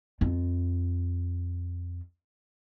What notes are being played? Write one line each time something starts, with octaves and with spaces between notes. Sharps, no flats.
F2 F4